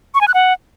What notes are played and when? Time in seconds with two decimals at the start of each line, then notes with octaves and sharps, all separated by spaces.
0.15 C#6
0.21 G#5
0.28 F#6
0.34 F#5